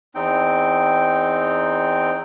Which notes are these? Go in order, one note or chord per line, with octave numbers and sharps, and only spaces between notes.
E2 C4 D#4 G5